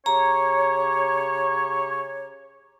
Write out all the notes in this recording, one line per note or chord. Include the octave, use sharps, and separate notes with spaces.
C#3 G4 C#5 A#5